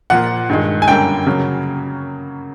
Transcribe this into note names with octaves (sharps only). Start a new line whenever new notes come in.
A#2 F3 A#3 F#5
G2 D#3 G#3
G#5
F#2 D3 G3 A#3 G5
C#3 F#3 A#3